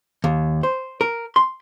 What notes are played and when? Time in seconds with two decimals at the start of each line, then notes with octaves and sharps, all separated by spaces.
0.24 D#2
0.63 C5
1.01 A#4
1.36 C6